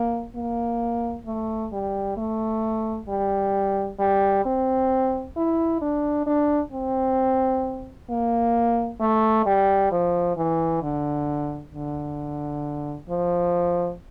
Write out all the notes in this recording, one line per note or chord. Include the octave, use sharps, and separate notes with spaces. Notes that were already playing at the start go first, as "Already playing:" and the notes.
Already playing: A#3
A#3
A3
G3
A3
G3
G3
C4
E4
D4
D4
C4
A#3
A3
G3
F3
E3
D3
D3
F3